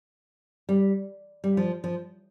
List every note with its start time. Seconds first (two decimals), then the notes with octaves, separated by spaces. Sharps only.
0.69 G3
1.44 G3
1.57 F3
1.84 F3